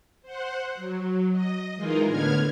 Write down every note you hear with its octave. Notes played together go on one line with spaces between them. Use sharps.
C5 F#5
F#3
D#5
E3 G#3 D#4 F4 G#4 A#4
A2 D3 B3 F6 G#6